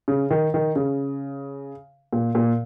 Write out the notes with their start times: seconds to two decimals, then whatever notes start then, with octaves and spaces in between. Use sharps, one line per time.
0.08 C#3
0.31 D#3
0.54 D#3
0.76 C#3
2.13 A#2
2.35 A#2